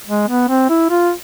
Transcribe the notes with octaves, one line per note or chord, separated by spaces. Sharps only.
G#3
B3
C4
E4
F4